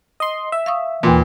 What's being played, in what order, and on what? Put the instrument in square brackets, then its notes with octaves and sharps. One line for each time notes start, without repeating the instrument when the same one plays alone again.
[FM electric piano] D#5 C6
E5
[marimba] F5 C#6 D#6
[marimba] D#2 C6 [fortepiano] A#2 [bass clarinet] E3